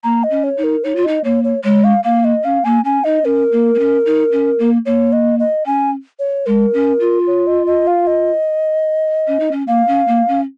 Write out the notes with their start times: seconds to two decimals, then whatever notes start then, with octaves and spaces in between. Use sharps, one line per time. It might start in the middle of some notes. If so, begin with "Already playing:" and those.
0.04 A#3 A#5
0.24 D#5
0.30 C#4
0.44 C#5
0.57 D#4
0.64 A#4
0.84 D#4 C#5
0.96 F4
1.04 D#4 D#5
1.24 A#3 C#5
1.44 C#5
1.64 G#3 C#5
1.84 F5
2.04 A#3 F5
2.24 D#5
2.44 C#4 F5
2.64 A#3 G#5
2.85 C#4 G#5
3.04 D#4 D#5
3.25 C#4 A#4
3.52 A#3
3.75 A#3
3.79 C#4
4.06 D#4
4.32 C#4
4.59 A#3
4.86 A#3 C#5
5.13 D#5
5.39 D#5
5.66 C#4 G#5
6.19 C#5
6.46 G#3 A#4
6.74 C#4
7.00 F4
7.27 C#5
7.47 D#5
7.67 D#5
7.87 F5
8.07 D#5
9.27 C#4
9.40 D#4
9.51 C#4
9.68 A#3 F5
9.88 C#4
10.08 A#3
10.28 C#4